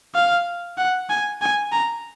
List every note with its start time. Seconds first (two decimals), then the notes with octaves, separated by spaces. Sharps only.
0.15 F5
0.78 F#5
1.10 G#5
1.42 G#5
1.72 A#5